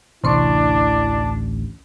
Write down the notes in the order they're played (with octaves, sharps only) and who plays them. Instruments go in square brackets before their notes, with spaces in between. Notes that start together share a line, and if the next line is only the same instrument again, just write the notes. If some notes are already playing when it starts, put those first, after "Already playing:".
[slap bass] A1 D2 E3 [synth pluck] C3 C6 C#6 [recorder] D4 [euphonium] E4